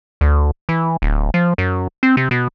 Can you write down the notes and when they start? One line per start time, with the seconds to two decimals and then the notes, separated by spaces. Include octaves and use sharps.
0.21 D2
0.69 E3
1.02 D1
1.34 F3
1.58 F#2
2.03 C4
2.17 C3
2.31 B2